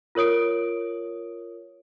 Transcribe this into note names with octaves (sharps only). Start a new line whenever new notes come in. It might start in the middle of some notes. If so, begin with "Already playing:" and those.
F4 A#4 C#5 D#6 D7